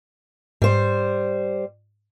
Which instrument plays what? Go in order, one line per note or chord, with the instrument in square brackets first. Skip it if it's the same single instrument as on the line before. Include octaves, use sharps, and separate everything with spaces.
[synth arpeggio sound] G#2 [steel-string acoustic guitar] G3 C5